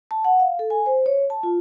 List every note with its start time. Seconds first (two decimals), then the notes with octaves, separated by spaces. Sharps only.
0.11 A5
0.25 F#5
0.40 F5
0.59 A4
0.70 G#5
0.86 C5
1.06 C#5
1.30 A5
1.43 F4